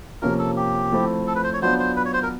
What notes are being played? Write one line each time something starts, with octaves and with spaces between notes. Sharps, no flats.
C3 F3 A#3 C#4 F4 A#4
A4
G4
F3 A3 C4 E4
A4
B4
C5
C#5
F#3 B3 D4 F4 C5
C5
B4
C#5
C5
A#4